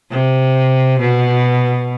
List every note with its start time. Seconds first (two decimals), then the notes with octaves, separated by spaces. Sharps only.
0.11 C3
1.00 B2